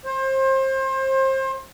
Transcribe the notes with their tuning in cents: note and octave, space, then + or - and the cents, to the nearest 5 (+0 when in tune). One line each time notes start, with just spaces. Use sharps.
C5 +30